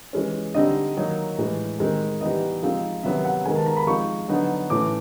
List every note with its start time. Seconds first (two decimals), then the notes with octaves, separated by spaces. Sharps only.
0.13 E3 G#3 C#4
0.54 D3 G3 C4 D#4 D#5
0.96 D#3 F#3 A#3 D#4
1.38 A2 E3 G#3
1.79 D#3 G#3 C4 D#4
2.21 E3 G3 B3 D#4 D#5
2.63 F3 G#3 C4 D#4
3.03 C3 D#3 F#3 B3 E5
3.25 F#5
3.45 D#3 G#3 B3 G#5
3.56 A5
3.66 A#5
3.77 B5
3.87 F3 G#3 C4 D#4 C#6
4.28 D3 F#3 B3 D#4
4.70 A2 E3 A3 C#4 D6